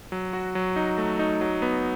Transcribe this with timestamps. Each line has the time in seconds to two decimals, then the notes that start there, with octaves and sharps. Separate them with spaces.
0.12 F#3
0.33 F#4
0.55 F#3
0.76 D#4
0.98 A3
1.19 D#4
1.41 F#3
1.62 B3